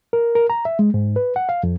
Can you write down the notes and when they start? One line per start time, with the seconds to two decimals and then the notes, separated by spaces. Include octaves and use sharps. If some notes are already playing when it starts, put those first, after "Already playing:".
0.13 A#4
0.35 A#4
0.50 A#5
0.65 E5
0.79 G#3
0.94 G#2
1.16 B4
1.36 F#5
1.49 F5
1.63 F2